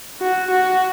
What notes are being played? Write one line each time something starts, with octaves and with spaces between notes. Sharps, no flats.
F#4
F#4